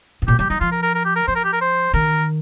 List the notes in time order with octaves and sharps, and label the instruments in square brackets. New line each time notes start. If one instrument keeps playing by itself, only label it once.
[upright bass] G2
[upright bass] A#2 [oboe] G4
[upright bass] G3 [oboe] G4
[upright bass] G3 [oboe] D#4
[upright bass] F3 [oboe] F4
[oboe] A#4
A#4
A#4
G4
A#4
[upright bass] F3 [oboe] C5
[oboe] A#4
G4
A#4
C5
[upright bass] D#3 [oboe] A#4